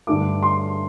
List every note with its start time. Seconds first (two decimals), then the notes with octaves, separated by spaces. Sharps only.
0.07 G2 D3 A3 D6
0.43 C6